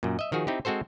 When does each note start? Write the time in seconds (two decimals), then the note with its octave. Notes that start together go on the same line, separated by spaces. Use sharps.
0.03 F#2 A#2
0.19 D#5 E5
0.32 D#3 F3 F#4 G#4
0.47 C4 D#4 E4 G4
0.65 G#3 C4 F#4 A4 C5